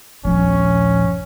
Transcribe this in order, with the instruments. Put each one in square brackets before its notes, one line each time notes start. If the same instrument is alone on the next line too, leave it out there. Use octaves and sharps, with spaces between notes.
[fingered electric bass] D#1 A#1 [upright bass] F3 [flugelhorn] C#4